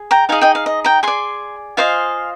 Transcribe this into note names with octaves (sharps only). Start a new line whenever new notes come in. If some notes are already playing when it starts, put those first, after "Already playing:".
Already playing: G#4
G5 A#5
D#4 G#4 D#5 F5 G#5
D#5 G5
F5
D#5
G5 A#5
G#4 D5 G#5 C6
F4 C5 D#5 F5 G#5